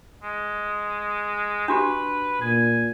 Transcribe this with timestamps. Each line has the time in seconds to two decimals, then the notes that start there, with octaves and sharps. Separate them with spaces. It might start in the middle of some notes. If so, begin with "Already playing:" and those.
0.23 G#3
1.68 D4 F#4 G4 B4
2.41 A#2 G#5